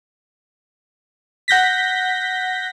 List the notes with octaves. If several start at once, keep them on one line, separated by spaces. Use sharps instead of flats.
F#5 G6 A#6 B6